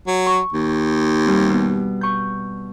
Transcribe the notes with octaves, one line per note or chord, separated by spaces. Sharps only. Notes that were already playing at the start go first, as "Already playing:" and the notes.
F#3
C#6
D#2
G3 C4
B2
C#6 G6